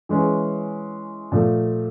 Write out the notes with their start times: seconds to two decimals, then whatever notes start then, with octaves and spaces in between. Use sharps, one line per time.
0.09 E3 G#3 C#4
1.32 A#2 F3 A3